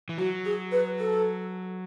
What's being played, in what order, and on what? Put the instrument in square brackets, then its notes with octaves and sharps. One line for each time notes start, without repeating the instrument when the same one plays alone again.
[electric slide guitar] E3
[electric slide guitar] F#3 [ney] F#4
[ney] G#4
B4
A4